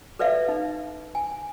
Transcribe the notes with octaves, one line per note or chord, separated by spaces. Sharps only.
A4 B4 D5 E5 F5
D#4
G#5